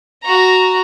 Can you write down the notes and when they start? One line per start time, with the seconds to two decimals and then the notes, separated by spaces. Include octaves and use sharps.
0.23 F#4 A#5